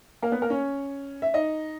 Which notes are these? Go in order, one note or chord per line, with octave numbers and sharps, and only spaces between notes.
A#3 A#4
B3 B4
A#3 A#4
C#4 C#5
E5
D#4 D#5